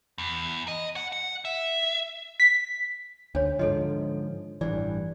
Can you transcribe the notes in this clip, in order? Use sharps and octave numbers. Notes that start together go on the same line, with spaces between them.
E2
D#5
F#5
F#5
E5
B6
D2 D4 C#5
G#2 D3 F3 A4 C#5 D#5
A1 G2 E3 D5